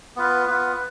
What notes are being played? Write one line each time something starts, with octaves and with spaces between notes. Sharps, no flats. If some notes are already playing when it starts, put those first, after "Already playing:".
B3 F4 B4
B3 F4 B4